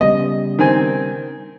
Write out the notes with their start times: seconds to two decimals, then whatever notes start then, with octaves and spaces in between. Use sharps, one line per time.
0.01 C#3 G3 B3 D#5
0.59 D#3 C4 G#5